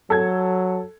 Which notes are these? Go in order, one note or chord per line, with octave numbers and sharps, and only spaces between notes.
F#3 A4 G#6